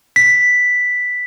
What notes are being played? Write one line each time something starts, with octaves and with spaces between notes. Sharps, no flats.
B6